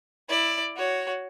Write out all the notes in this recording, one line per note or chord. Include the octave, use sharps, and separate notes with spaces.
E4 D5
F#4 C#5